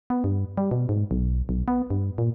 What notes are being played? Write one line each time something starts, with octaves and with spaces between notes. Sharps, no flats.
B3
G2
G3
B2
G#2
B1
B1
B3
G2
A#2